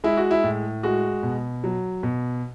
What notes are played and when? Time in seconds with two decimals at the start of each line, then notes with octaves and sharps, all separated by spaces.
0.04 G#3 E4
0.17 F#4
0.31 E4
0.44 A2
0.83 G#3 F#4
1.23 B2
1.64 F#3
2.03 B2